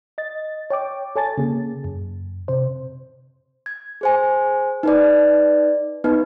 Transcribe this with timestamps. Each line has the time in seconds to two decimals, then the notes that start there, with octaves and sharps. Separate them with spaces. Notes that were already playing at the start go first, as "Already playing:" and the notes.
0.18 D#5 A6
0.70 C#5 G5 D6
1.16 A4 C#5 G#5 A5 A6
1.38 C#3 A#3 G#4
1.84 F#2
2.48 C3 C5
3.66 G#6
4.01 G#4 C5 G#5
4.83 D#4 B4 D5
6.04 B3 D#4 B4 D#5